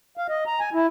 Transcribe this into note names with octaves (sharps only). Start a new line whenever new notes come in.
F5
D#5
A#5
G#5
E4